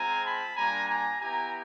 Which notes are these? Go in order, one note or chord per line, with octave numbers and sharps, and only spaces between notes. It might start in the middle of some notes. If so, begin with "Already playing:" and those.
Already playing: G#3 C4 F4 G#5 A#5
A5 B5
G3 A#3 D4 F4 G#5 A#5
G#5 A#5
B3 E4 G4 G#5 A#5